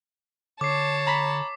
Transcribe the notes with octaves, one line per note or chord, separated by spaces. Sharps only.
D3 C#5 A5 D6 C7
A#5 B5 B6